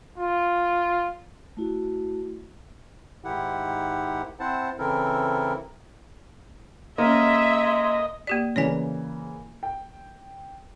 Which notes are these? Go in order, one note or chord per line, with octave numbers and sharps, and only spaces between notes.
F4
A3 E4 F#4
G#2 D#3 E4 G4 F#5
C4 E4 C5 F#5 A5
C#3 E3 C4 E4 A4 A#4
G#3 A#3 C#4 D#5 E5
A#3 G4 D5
C#3 E3 A#3 C#5 D5 G#5
G5